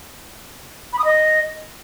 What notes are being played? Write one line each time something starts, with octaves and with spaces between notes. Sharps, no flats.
B5
D#6
D#5